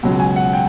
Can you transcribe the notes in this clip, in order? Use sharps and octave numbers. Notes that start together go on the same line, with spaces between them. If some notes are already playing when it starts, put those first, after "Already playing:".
C#2 B2 F#3
G#5
F#5
G5